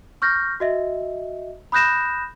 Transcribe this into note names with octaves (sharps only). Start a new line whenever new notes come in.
C#6 F6 G6 A#6
F#4 D#5 E5
B5 D#6 F#6 G6 A#6 E7